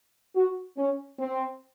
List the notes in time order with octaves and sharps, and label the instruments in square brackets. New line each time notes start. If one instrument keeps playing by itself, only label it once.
[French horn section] F#4
C#4
C4